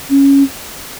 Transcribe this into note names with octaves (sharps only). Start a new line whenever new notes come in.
C#4